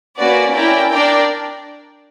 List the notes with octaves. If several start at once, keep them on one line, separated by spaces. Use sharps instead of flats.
A#3 C#4 F#4 B4 D5
C#4 E4 A#4 D5 G5
D4 A#4 D5 G5